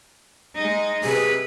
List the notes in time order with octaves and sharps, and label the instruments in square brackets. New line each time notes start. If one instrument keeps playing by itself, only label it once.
[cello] G#3 D#4
[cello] C3 B4 [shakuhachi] G#4